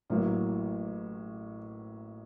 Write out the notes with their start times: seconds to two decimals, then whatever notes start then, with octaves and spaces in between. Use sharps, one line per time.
0.10 A1 A2 F#3 A#3 F4